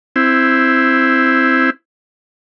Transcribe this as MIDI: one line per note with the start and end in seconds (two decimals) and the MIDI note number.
0.16 1.70 60
0.16 1.70 64